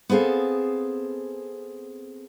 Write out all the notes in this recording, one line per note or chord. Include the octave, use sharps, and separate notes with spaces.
B3 C4 G#4 A4 F5